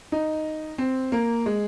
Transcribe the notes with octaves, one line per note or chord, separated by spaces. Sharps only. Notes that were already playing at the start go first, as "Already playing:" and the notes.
D#4
C4
A#3
G#3